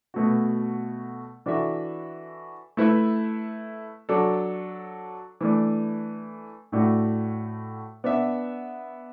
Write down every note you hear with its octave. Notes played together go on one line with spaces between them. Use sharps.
B2 A3 F#4
E3 D4 F#4 A4 E5
A3 E4 B4 E5
F#3 D4 A4
E3 A3 D4
A2 A3 D4 F#4
B3 D4 B4 E5